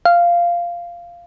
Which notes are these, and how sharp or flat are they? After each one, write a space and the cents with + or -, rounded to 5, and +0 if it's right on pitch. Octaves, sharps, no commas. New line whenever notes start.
F5 -10